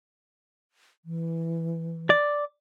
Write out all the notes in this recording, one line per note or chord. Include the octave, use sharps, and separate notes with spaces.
E3
D5